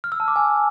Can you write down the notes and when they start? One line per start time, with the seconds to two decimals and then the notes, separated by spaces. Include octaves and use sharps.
0.04 F6
0.12 E6
0.20 A5
0.28 D6
0.36 G#5